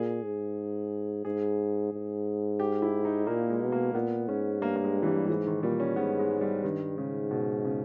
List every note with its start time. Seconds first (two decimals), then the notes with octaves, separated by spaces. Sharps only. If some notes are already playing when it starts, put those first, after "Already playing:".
Already playing: A#2 G#4
0.25 G#2
1.25 G#2 G#4
1.93 G#2
2.60 G4
2.82 E4
3.05 D#4
3.27 A#2 A#3
3.50 G#3
3.61 B2
3.72 A#3
3.94 A#2 B3
4.28 G#2 C#4
4.62 G2 A#3
4.76 A#3
4.84 G#3
5.02 E3
5.06 G3
5.29 G#2 E3
5.47 D#3
5.62 A#2 G3
5.80 C#4
5.96 G#2 B3
6.19 G#3
6.41 G3
6.64 G2 D#3
6.97 G#2 C#3
7.31 B2
7.64 C#3